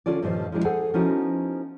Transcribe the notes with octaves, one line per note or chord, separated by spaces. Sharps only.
D3 C#4 F4 G#4 D5
G2 A#2 D#3 F3 C#4 C5
F3 F#3 G#3 D4 E4
G#4 A4 C5 F#5 G#5
F3 B3 C#4 D#4 E4 F#4